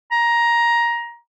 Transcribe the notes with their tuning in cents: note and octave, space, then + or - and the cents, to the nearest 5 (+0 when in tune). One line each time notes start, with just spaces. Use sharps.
A#5 +15